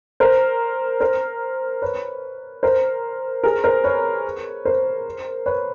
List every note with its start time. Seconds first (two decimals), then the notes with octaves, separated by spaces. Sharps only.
0.20 A#4 C5
1.00 A#4 C5
1.82 B4 C#5
2.63 A#4 C5
3.44 G#4 A#4
3.64 A#4 C5
3.84 B4 C#5
4.65 A#4 C5
5.46 B4 C#5